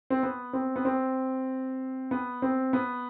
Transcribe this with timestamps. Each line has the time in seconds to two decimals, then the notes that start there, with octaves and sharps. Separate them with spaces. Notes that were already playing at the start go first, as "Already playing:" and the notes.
0.10 C4
0.23 B3
0.53 C4
0.76 B3
0.85 C4
2.11 B3
2.42 C4
2.73 B3